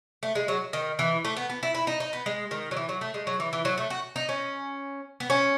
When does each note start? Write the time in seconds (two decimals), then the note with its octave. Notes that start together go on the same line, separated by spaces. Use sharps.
0.23 A3
0.35 G#3
0.48 F#3
0.73 D#3
0.99 E3
1.24 A3
1.36 B3
1.50 B3
1.63 E4
1.75 E4
1.87 D#4
2.00 D#4
2.13 B3
2.26 G#3
2.51 D#3
2.71 F#3
2.77 E3
2.89 F#3
3.01 A3
3.14 G#3
3.27 F#3
3.40 E3
3.53 E3
3.65 F#3
3.77 A3
3.90 F#4
4.16 D#4
4.29 C#4
5.20 B3
5.30 C#4